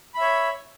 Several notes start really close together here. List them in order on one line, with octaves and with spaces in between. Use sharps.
B5 E5 C#5